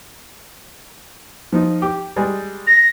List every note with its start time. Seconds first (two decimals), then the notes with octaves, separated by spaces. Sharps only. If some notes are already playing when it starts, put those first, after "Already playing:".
1.52 F3 D#4
1.82 G4
2.16 G3 G#3
2.67 A#6